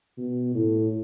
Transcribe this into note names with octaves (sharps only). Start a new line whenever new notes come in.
B2
A2